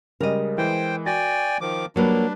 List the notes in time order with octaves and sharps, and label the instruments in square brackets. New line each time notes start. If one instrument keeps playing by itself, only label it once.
[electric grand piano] C#3 G3 G#3 [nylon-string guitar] A#4 D#5
[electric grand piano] E3 G#3 [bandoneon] C5 G5
[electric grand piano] F#4 A6 A#6 [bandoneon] D5 G5 G#5
[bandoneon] D#3 F3 D6
[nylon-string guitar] F#3 A#3 [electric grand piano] G3 B4 [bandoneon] D4